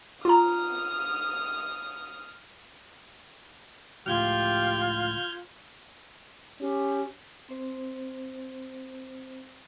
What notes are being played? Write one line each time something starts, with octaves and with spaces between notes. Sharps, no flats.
F4 A#5 D#6 F6
C#2 A2 F3 F4 G4 F6 G6 G#6
C#4 G4
C4 C5